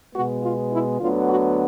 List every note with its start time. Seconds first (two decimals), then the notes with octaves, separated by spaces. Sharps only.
0.14 B2 G#3 B3 F#4
0.42 F4
0.71 E4
0.99 D2 D3 F#3 B3 F4
1.28 F#4